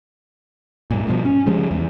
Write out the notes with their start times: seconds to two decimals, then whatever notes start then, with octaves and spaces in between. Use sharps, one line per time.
0.91 G2 A#2
1.07 G2 B2 F3
1.25 C#4
1.46 C#3 F3 G3 G#3
1.71 E2